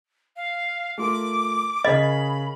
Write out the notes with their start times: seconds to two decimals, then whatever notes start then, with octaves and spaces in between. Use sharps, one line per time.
0.36 F5
0.98 A3 F4 A#4 D6
1.85 C#3 G#4 A#4 D#5 B5